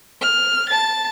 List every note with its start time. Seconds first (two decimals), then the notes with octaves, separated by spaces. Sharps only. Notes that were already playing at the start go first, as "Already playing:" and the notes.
0.21 F6
0.69 A5 A6